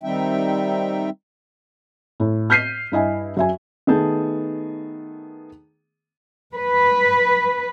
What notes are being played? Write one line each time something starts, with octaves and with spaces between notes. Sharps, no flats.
D#3 G3 C4 D#4 E5 G5
A2
F6 G6 B6 C7 D#7
G2 E4 D#5 G#5
F#2 E5 G#5
D#3 A3 B3 G#4 A5 G6
B4